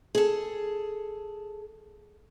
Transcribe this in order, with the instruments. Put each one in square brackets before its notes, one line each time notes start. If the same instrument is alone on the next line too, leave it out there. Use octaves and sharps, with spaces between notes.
[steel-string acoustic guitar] G#4 A4